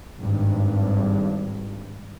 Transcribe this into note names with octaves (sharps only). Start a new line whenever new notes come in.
G#1 G2